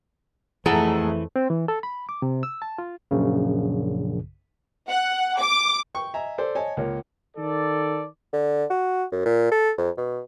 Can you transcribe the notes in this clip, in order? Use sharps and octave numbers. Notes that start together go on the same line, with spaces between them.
F2 E3 A3 G#4 A4 F#5 A#5
C4
E3
A4
B5
D6
C3
E6
A5
F4
A#1 F#2 C#3
F#5
D6
G5 C#6
D#5 E5 G#5 A#5
A4 C5 D5
C#5 D#5 G#5 A5
C#2 A#3 C#5
D#3 A4 D5
D3
F#4
F#2
A#2
A4
F2
B2